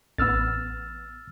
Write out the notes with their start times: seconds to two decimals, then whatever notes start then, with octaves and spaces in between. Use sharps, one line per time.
0.18 A1 B3 E6 F6 A6